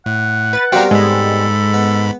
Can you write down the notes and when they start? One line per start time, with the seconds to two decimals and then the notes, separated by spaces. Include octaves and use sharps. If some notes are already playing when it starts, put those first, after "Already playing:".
0.06 A2 F#5
0.53 B4 A6
0.72 G3 B3 C4 F#4 G4 A#4 F5 G5
0.91 G#2 G#3 A4 B5
1.74 B3